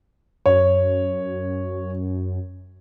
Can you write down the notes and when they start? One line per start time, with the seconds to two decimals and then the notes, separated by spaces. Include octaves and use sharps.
0.46 F#2 C#5